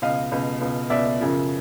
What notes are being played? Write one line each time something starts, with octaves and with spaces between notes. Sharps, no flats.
C#2 B2 D#5 F5
C#2 B2
C#2 B2
C#2 B2 D5 E5
F#2 C#3 F3